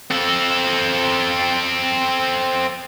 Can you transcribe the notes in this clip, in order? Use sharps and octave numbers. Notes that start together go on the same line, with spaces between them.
C4 A4